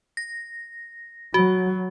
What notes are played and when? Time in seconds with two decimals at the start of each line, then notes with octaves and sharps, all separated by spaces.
0.17 A#6
1.34 F#3 F#4